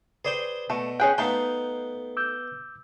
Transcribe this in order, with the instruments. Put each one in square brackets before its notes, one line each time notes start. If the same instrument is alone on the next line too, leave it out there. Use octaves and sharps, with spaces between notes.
[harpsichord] G#4 C5 G5 [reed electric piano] B4 D5
[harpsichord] B2 [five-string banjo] A3
[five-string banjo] C#4 G#4 G5 [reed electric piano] F#6
[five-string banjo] A3 D#4 [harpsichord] B3 F5 G5
[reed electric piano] D6 E6 G6